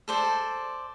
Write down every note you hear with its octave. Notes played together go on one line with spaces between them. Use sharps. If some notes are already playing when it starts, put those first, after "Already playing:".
A4 C5 D5